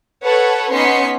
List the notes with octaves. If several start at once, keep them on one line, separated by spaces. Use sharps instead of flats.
A4 B4 C#5 F#5
B3 C#4 D#4 C6 B6 C#7